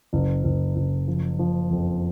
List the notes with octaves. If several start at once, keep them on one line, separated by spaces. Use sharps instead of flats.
F#1
F#1
F#1
F3
F3
F2